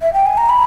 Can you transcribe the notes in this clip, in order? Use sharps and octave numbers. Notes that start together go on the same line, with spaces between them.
E5
G5
G#5
A#5
B5